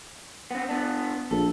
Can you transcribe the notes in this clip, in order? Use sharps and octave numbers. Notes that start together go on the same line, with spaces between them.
B3 C4
B3 D4
A#1 A4